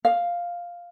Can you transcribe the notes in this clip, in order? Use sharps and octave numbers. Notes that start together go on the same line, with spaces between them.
F5